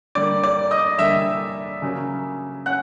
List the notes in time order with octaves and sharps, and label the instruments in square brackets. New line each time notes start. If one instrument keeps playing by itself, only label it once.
[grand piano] D3 G3 A#3 D5 D6
D5 D6
D#5 D#6
D3 G3 A#3 E5 E6
C#3 F#3 A#3 C#4
C#4 F#5 F#6